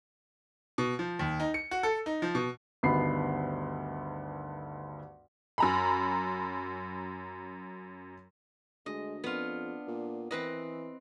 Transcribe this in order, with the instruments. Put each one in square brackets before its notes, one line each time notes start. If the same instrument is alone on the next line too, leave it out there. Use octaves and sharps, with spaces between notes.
[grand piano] B2
F3
D#2
D#4
C#7
F#4
A4
D#4
F3
B2
[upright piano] D2 G2 D#3 B3 B5 C7
[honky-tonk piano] F#2 A#5 B5
[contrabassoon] D2 [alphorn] G#3 [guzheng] D#5
[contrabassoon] F2 [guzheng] B3 F4 [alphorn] D4
[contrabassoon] A#2
[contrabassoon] E3 [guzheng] C4 B4 D#5